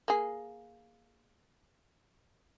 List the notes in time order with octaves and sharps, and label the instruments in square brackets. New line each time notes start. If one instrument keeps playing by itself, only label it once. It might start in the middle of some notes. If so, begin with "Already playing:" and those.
[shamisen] A#3 G#4